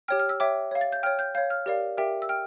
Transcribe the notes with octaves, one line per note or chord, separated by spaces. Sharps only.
G4 C#5 G5 F6
F6
E6
C#5 E5 G5 D6
C#5 F5
A6
G6
C#5 G5 F6
G6
C#5 F5 G6
F6
G4 A#4 D5 F5
G4 A#4 E5 G5
E6
G5 F6